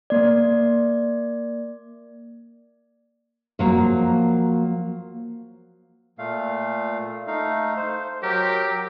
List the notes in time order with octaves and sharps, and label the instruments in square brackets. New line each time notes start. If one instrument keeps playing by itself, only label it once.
[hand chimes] A#3 D5
[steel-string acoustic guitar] F3 F#3 A#3
[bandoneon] A#2 A3 F5
A3 D#4 F5
C5
[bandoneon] F#3 A#4 [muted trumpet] G4